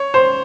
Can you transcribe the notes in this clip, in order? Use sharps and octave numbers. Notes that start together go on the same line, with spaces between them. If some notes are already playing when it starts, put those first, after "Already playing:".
Already playing: C#5
C5